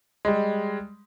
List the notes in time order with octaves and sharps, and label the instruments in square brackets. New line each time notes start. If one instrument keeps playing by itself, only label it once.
[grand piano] G3 G#3